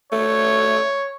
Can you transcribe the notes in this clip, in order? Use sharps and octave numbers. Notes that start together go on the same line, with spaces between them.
A3 C#5